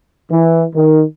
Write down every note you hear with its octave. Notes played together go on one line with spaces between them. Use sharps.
E3
D#3